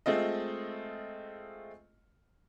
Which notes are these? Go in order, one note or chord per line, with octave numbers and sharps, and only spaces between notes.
G#3 A3 C4 F4 D#5